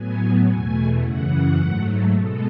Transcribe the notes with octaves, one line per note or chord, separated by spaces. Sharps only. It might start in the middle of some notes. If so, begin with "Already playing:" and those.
Already playing: A2 F#3 B3 G#5
E2 B2 A3 G#5
F#2 C#3 E3 F#5
G#2 F#3 A3
B2 G#3 B3 A4